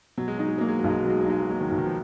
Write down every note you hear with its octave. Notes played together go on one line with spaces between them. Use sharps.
B2 F#3
G#3
F#3 D#4
G#3
F#3 A#3
G#3
B1 F#3
G#3
F#3
B2 G#3
F#3
G#3 D#4
F#3
G#3 A#3
D#3 F#3
B1
D#3
F3